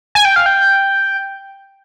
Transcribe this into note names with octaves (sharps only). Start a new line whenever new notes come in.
G#5
G5
F5
G5